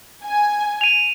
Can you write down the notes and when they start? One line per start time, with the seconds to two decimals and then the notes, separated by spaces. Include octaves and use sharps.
0.25 G#5
0.81 D#7 F7